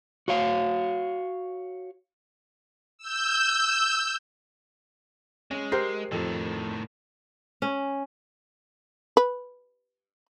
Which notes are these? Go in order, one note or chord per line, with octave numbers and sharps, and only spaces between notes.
F#4 C#5 F5
E6 G6
G#3 C#4
G4 A#4 C5 C7
F2 A2 D#3 A4
C#4
B4